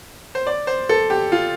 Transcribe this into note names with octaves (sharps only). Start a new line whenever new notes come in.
C5
D5
C5
A4
G4
F4